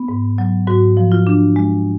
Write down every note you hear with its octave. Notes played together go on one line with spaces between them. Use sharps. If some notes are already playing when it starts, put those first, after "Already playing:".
Already playing: B3
G#2
F#3
G#2 F#4
F3
F4
D4
G#3